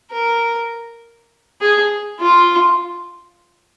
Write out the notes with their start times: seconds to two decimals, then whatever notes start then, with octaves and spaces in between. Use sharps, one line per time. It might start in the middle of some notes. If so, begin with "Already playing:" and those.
0.12 A#4
1.61 G#4
2.21 F4